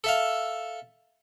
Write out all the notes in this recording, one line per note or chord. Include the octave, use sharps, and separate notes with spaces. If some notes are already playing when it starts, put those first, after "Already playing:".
A4 E5 F5